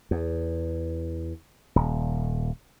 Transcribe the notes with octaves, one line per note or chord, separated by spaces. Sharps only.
E2
D#1